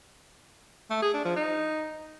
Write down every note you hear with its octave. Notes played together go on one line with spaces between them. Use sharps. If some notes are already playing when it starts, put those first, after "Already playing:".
A3
G#4
D4
F3
D#4